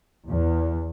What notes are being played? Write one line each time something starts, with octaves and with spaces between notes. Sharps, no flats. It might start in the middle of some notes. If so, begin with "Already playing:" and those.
E2